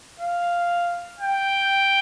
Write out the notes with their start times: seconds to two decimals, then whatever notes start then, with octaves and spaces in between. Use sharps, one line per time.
0.19 F5
1.20 G5